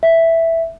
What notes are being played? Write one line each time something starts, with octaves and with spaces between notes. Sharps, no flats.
E5